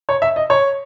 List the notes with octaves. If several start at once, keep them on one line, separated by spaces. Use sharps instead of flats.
C#5
E5
D#5
C#5